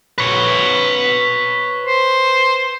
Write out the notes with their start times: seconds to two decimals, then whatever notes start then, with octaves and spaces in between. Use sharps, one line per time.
0.18 B4 C#5
1.87 C5